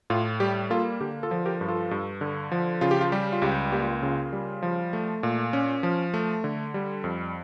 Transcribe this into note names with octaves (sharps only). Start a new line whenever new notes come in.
A2 F4
G3 G4
A#3 F4 A4
D3 G4
F4 A4
F3
G4 A#4
G2
F4 A4
G2
D3
F3
C#3 F4
G4
F4
G3 G4
F4
C#2 G4
A#3 G4
F4
C#3 F4
G3
F3
A3
A#2
C#4
F3
A3
D3
G3
F2